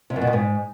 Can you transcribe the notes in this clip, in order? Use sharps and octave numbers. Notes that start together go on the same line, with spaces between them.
C3
F#2
B2
G2
G#2